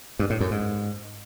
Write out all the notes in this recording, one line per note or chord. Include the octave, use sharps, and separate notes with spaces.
G2
A2
F#2
G#2